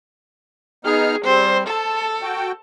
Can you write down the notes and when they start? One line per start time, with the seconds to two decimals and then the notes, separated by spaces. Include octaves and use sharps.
0.85 B3 D#4 G#4 F6
1.25 G3 C4 C5
1.68 A4 A5
2.22 F#4 G5